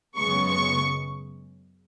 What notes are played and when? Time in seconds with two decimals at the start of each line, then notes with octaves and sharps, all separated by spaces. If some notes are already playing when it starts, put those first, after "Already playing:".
0.17 F#2 C#3 G#3 B3 C#6
0.47 C#6